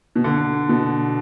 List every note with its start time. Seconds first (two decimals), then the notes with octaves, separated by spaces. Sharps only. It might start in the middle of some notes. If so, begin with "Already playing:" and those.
0.16 B2
0.24 D3
0.69 B2